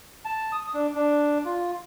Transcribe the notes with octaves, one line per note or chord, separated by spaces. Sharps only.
A5
D#6
D4
D4
F4